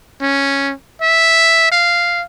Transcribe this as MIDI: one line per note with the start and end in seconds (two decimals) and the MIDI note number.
0.21 0.73 61
1.01 1.67 76
1.72 2.24 77